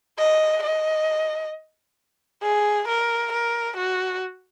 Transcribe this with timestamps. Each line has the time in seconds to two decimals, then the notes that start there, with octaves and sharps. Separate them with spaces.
0.18 D#5
0.63 D#5
2.43 G#4
2.88 A#4
3.33 A#4
3.77 F#4